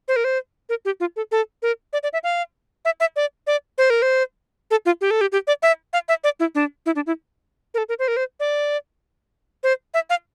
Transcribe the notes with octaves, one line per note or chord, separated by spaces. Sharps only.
C5
A#4
C5
A#4
G4
F4
A4
A4
A#4
D5
D5
E5
F5
E5
E5
D5
D5
C5
A#4
C5
A4
F4
G4
A4
G4
G4
D5
E5
F5
E5
D5
E4
D4
E4
D4
E4
A#4
A4
A#4
C5
A#4
C5
D5
C5
E5
F5